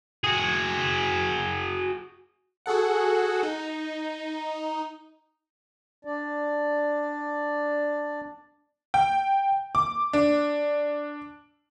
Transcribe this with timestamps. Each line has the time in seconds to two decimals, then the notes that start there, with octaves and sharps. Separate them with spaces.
0.24 F#4 G#4
2.66 F#4 G#4 A4 F#5
3.43 D#4
6.05 D4 D5
8.94 G5
9.75 D6
10.13 D4